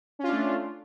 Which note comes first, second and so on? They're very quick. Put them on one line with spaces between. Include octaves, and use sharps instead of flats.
C#4 F4 D4 A3